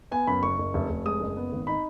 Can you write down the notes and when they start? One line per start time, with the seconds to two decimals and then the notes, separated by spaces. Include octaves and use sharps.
0.11 B3 G#5
0.27 F#2 B5
0.42 F#1 C#6
0.59 F#1
0.74 F1
0.90 F1
1.06 G#3 D#6
1.20 F#1
1.37 B3
1.52 G#1
1.67 D#4 B5